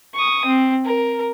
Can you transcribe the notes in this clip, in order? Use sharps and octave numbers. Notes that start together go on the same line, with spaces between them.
C#6 D#6
C4
A#4